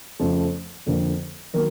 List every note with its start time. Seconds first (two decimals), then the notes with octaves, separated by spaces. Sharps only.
0.20 F2 C#3 F3 A3
0.86 F2 D3 F3 A#3
1.53 D#3 F#3 A#3 A#4